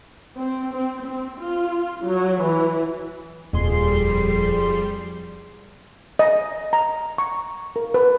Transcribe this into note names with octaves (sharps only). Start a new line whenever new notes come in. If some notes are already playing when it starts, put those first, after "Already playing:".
C4
C4
C4
F4
F4
F#3
E3
D#1 F2 G3 G#4 C6
D#5
A#5
C#6
A#4
B4